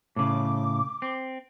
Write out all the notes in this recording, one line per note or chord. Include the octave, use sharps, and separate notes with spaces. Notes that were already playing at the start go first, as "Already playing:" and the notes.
A2 C#3 D6
C4